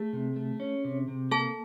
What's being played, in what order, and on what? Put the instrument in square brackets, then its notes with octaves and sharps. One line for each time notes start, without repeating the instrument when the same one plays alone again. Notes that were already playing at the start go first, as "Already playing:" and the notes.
Already playing: [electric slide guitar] A3 [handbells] G#4
[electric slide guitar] C3
A3
C#4
C3
C3
[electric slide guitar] A#3 [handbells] A4 A5